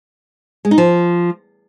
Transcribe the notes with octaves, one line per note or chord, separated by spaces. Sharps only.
G#3
D#4
F3